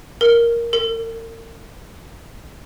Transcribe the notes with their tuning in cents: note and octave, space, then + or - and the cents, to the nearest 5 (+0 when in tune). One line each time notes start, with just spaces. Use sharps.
A#4 +5
A#4 -45